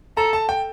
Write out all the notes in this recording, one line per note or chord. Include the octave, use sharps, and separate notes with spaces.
A4 A#5
A5
G5